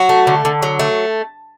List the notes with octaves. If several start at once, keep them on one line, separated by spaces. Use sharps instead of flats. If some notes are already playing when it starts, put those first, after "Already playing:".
Already playing: F#3 F#4
A3
D3
D3
F#3
A3